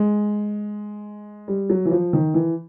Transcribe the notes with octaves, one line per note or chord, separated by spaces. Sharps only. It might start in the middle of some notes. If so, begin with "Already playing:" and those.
Already playing: G#3
G3
F#3
E3
F3
D#3
E3